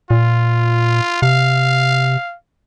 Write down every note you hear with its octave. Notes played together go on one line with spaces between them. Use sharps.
A#2 F4
C3 F5